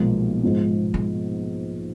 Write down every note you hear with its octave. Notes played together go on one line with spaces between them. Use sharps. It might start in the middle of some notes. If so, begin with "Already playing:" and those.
Already playing: B1 A#2 F3 G#3 A#3
G#2 F3 B3
G#3